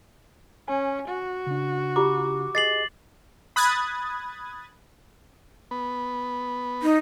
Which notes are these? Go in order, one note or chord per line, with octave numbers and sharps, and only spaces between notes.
C#4 G#5
F#4
C#3 D4
F4 G4 A#5 D6
G#4 D#5 D6 A6 C7 F#7
B5 D#6 F#6 G#6 A6
B3
D#4